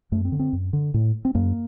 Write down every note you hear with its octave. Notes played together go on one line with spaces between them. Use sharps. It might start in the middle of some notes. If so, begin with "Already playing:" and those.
F#2 A3
C4
D3
C4
F#2
D3
A2
C4
F#2 A#3